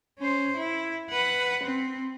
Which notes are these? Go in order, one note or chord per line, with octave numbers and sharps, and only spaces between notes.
C#4 C5
E4
B4 F#5
C4